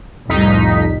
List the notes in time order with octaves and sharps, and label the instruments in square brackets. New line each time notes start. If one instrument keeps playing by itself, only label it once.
[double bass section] C2 A2 G3 [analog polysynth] F2 D#4 B6